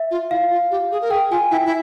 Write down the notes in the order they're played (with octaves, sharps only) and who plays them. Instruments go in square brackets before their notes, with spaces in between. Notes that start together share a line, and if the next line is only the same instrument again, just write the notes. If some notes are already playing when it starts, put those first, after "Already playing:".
Already playing: [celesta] E5
[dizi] F4
[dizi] E4 [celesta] F5
[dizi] F4
G4
G#4
A#4
[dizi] G#4 [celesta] G5
[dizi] F4 [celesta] G#5
[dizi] E4 [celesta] G5
[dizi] E4